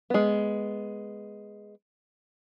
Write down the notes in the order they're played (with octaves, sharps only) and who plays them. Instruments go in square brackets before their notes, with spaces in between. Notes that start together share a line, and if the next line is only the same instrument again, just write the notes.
[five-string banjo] G#3 B3